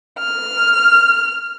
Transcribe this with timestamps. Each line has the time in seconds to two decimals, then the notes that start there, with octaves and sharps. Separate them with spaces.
0.18 F6